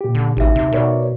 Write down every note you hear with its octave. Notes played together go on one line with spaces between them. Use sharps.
A#2 G4
D3
A1 D2 D#4 G4 E5
C3
B2 A#4 C#5 D5